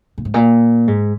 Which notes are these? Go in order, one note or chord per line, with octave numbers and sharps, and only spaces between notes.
A#2
G#2
A#2
G#2